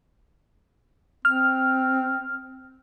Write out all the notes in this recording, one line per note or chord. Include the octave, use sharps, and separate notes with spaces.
C4 F6